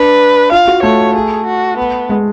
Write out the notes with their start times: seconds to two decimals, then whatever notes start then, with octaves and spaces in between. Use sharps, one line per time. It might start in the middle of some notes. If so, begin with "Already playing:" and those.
Already playing: D4 B4
0.51 F4 F5
0.68 F#4
0.83 A3 C#5
1.15 G#4
1.46 F#4
1.77 B3
2.09 G#3